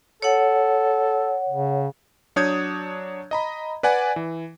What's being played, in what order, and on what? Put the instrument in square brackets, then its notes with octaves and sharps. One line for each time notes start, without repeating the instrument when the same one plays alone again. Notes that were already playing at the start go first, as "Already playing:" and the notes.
[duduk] A4 [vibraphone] C#5 F#5
[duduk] C#3
[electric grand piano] F#3 D4 C#5 D#6 G6 G#6
D#5 A#5 B5
B4 D5 F#5 G#5
E3